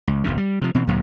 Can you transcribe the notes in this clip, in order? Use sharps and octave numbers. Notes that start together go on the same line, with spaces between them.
C#2
D1 B1 F#2 C#3
G3
C3 F3
B2 E3 C4
D2 G2 A#2 F#3